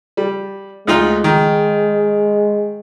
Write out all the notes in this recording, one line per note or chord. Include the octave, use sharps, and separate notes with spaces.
G3
D2 G#3 D#4 F4
D#3